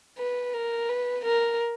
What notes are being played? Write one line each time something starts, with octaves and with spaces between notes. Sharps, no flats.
B4
A#4
B4
A#4